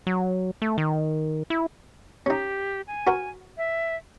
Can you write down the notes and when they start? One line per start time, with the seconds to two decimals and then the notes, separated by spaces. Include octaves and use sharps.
0.07 F#3
0.62 A3
0.78 D#3
1.50 E4
2.26 C#4 D#4 G4
2.87 G#5
3.07 F#4 A#4 C5
3.57 E5